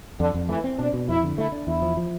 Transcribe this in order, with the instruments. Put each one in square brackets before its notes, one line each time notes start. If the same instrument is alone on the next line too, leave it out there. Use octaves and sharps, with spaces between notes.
[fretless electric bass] F2 [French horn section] D3
[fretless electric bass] F2
[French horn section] E3 [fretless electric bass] A3
[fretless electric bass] C4
[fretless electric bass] B2 [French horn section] D4
[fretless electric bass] B2
[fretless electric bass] F2 [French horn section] E4
[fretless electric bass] D3
[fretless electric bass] A3 [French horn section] E4
[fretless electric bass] D4
[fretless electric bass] E2 [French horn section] E4
[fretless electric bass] F3
F3